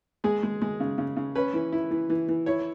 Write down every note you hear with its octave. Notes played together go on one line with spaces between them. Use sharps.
G#3 G#4
G#3
G#3
C#3
C#3
C#3
C#4 B4
E3
E4
E3
E3
E3
E4 C#5